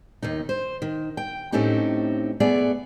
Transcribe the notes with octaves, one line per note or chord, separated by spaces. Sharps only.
D#2 D#3 D#4
C5
D#3
G5
A2 A3 C4 C#4 D#4 G4
A3 B3 G#4 D5